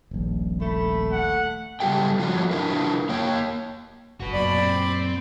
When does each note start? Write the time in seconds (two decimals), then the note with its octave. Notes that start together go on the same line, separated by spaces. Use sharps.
0.11 D#1 A#1
0.61 A3 B5
1.11 F#5
1.80 C#3 G3 F4 G4 A4 G5
2.19 F3 F4 F#4 A4 C#5 A#5
2.51 D4 E4 F4 A#4 B4
3.09 A#3 C#5 G5
4.20 D1 G1 F#4 B4
4.33 F#2 A#2 D5 B5
4.58 C4